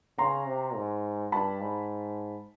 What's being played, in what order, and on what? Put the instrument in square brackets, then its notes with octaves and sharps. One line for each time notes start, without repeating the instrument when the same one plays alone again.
[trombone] C#3 [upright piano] A#5 C6
[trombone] C3
G#2
[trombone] G2 [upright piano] A5 B5
[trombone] G#2